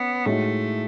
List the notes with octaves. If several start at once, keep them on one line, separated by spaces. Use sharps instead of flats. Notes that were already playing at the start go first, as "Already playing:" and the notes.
Already playing: B3 C#4
A2 G#3 A3 D#4 F#4